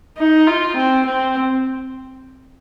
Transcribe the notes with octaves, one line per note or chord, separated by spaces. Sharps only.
D#4
F4
C4
C4